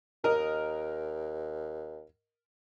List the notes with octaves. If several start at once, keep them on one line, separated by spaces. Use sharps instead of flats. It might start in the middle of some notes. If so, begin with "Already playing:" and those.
D#2 A#4 D#5